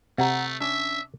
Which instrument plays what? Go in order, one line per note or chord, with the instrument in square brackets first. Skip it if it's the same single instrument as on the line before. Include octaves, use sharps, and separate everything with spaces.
[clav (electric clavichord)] C3 [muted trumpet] A3 [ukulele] F#5 A#5
[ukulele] C#4 D4 [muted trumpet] E5